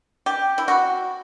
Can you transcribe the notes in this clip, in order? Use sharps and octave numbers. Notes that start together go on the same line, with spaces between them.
G4
E4
F#4